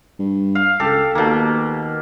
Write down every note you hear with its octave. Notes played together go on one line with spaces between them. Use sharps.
G2
F5
C#2 G4 A4
D#2 B2 A#3